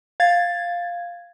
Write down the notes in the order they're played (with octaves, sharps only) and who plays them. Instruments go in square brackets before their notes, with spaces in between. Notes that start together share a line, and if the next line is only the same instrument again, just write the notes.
[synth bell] F5 G#6 A6